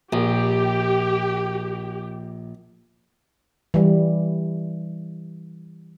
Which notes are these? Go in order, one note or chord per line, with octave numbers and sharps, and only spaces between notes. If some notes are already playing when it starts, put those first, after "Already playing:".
A#1 G4
E3 G3